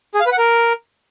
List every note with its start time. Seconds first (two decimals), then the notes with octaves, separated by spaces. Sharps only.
0.14 G#4
0.20 F5
0.26 B4
0.32 F#5
0.38 A#4